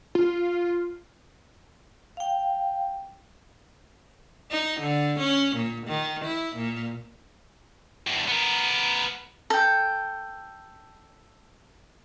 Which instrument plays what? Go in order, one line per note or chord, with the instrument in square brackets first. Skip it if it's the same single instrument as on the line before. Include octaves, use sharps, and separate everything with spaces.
[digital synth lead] F4
[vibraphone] F5 G5
[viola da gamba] D#4
D3
C#4
A#2
D#3
E4
A#2
[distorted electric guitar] E2 G2
B3 A#4
[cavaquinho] A4 G5